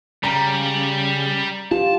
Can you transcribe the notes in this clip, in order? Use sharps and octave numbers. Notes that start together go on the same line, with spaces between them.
C#3 G3 A#5
F4 G4 A5